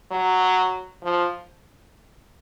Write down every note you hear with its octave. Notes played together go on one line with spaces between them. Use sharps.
F#3
F3